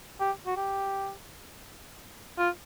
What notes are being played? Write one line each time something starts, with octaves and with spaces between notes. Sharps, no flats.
G4
F#4
G4
F4